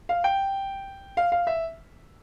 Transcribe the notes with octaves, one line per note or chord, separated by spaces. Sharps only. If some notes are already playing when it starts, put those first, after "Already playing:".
F5
G5
F5
F5
E5